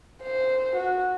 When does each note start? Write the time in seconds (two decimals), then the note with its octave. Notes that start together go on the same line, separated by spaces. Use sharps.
0.22 C5
0.76 F#4